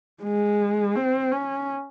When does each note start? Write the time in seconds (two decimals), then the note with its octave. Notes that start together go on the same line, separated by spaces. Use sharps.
0.23 G#3
0.96 C4
1.32 C#4